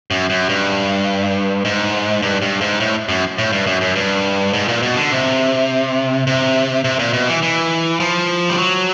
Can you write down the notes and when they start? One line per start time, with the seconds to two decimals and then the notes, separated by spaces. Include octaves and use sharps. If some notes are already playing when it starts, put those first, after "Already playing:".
0.11 F#2
0.30 F#2
0.49 G2
1.65 G#2
2.22 G2
2.42 G2
2.61 G#2
2.80 A2
3.09 F#2
3.38 A2
3.53 G2
3.66 F#2
3.81 F#2
3.96 G2
4.53 G#2
4.68 A#2
4.83 B2
4.97 D3
5.12 C3
6.27 C3
6.84 C3
6.99 A#2
7.13 B2
7.29 E3
7.43 E3
8.00 F3
8.49 G3
8.58 F#3